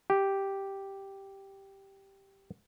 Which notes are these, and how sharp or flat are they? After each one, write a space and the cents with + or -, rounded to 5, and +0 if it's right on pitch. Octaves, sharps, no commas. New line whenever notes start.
G4 -5